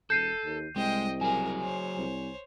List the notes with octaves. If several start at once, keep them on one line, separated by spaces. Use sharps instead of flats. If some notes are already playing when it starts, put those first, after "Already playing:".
E1 A4 G6 C7 D#7
D#2
C2 G#3 D#5 G5
F#3 G#4 A#4 G#5
C5 C#5
C2